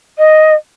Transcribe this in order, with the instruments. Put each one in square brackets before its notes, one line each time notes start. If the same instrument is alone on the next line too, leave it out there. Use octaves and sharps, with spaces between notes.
[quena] D#5